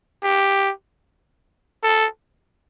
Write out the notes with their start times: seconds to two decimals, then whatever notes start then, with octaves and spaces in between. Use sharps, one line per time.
0.24 G4
1.83 A4